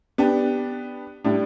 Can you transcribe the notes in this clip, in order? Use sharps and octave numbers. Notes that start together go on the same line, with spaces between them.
B3 D4 G4
A2 G3 D4